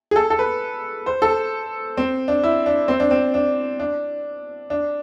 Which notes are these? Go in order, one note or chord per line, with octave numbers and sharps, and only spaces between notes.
G#4
A4
A4
B4
C5
A4
C4
D4
E4
D4
C4
D4
C4
D4
D4
D4